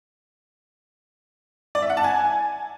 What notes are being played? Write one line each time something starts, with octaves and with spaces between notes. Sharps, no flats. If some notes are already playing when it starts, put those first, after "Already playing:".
D5
E5
F#5
A5
G#5